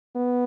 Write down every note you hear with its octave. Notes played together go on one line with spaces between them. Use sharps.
B3